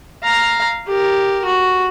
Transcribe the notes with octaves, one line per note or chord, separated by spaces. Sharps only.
F5 A#5
G4 A#4
F#4